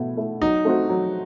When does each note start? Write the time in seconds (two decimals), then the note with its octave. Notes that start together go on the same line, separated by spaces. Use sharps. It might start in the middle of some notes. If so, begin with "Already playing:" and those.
Already playing: B2 A3 E4
0.17 A3 E4
0.42 F#3 D#4
0.65 A3 C4 F#4
0.89 F#3